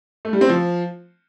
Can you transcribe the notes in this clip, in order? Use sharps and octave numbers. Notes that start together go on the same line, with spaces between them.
A3
G3
C4
F3